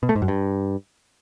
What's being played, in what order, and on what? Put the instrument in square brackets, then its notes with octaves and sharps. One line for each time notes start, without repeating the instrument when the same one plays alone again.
[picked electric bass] B2
A3
G#2
F#2
G2